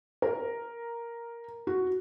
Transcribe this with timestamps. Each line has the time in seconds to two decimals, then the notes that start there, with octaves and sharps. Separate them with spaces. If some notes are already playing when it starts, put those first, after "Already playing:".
0.22 A#4
1.67 F#4